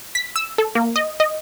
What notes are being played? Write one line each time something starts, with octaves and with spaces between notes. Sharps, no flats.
B6
E6
A4
A#3
D#5
D#5